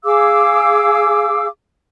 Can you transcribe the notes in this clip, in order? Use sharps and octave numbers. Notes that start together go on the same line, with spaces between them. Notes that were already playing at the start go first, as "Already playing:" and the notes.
G#4 F5 D6 E6